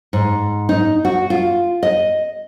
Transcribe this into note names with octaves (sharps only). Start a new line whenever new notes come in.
G#2
D#4
F#4
F4
D#5